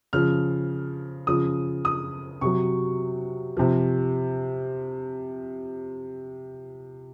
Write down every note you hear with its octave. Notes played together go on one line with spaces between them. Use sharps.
C#3 F3 F6
C#3 F3 D#6
D#6
C3 F#3 C#6
C3 F3